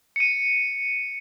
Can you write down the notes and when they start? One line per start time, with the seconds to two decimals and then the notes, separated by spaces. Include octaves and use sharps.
0.16 C#7 D#7